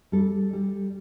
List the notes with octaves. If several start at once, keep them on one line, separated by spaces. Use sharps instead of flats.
G3 A4
G3